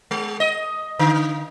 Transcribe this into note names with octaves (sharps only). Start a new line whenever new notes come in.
G#3
D#5
D3